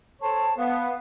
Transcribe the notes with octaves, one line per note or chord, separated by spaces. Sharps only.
A4 C5 C#5 A5
B3 F5